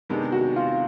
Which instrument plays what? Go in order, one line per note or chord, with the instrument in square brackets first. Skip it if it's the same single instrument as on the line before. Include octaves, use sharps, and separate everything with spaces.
[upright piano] C3 D#3 G#3 B3 D4
[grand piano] F#4
F4